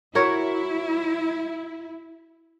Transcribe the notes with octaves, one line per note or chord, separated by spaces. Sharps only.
E4 F#4 A#4 C#5